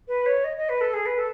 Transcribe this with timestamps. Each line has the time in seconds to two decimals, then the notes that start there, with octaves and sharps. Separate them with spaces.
0.08 B4
0.26 C#5
0.44 D#5
0.56 D#5
0.69 B4
0.81 A4
0.93 G#4
1.06 B4
1.18 A4